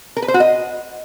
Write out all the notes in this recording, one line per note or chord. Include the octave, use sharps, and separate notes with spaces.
A#4
B4
C5
F#4
D#5